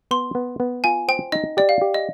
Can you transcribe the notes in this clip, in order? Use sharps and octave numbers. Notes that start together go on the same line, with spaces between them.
B3 C6
B3
B3
F4 G#5
C5 G5
D#4 D#5
G4 D5
F5
G4
D#5